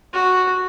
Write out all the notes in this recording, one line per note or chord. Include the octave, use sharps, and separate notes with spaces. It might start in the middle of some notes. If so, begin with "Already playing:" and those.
F#4